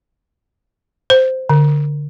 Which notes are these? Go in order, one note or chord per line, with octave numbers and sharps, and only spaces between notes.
C5
D3